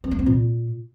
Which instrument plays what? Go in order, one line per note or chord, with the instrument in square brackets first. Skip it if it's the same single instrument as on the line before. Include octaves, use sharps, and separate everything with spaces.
[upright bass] C4
A#3
C4
A#2